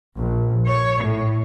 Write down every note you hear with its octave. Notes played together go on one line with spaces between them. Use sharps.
A#1
C#5
A2